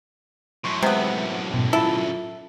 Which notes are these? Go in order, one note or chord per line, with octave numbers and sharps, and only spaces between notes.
F#2 A2 C6 C#6
C3 G#3 B3 F#5
G#2 B2
E4 F4 A4